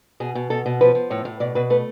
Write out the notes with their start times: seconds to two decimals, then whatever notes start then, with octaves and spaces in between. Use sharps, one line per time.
0.20 B2 G#4
0.35 B2
0.50 B2 A4
0.66 B2
0.81 F3 B4
0.95 F3
1.10 A2 C#5
1.25 A2
1.40 B2 D5
1.55 B2 B4
1.70 A3 B4